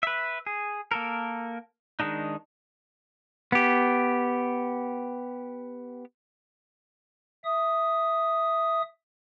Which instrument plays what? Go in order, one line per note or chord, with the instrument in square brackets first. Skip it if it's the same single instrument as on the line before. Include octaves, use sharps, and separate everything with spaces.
[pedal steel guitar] B4 E5
G#4
A#3 A4 A#4
D#3 G#3 D4 D#4
[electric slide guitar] B3 G4
[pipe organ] E5 D#6